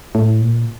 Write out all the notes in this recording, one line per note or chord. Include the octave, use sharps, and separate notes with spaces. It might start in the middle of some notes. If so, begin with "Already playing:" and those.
A2
A#2